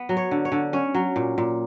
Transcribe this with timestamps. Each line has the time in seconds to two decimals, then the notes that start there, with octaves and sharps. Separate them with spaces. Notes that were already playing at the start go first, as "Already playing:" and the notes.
Already playing: B3
0.09 F#3
0.17 C#5
0.31 D3
0.45 C#5
0.52 D3
0.73 C#4 C#5
0.95 F#3
1.16 A#2
1.38 A#2